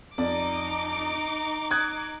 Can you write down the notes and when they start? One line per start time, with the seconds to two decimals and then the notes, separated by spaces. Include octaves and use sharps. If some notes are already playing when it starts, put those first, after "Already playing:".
0.18 F2 D#4 D5 D6
1.71 D#6 F#6 G#6